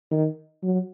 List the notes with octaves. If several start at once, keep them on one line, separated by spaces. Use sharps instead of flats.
D#3
F#3